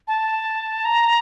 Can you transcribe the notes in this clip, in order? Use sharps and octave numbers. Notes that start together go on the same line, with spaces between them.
A5
A#5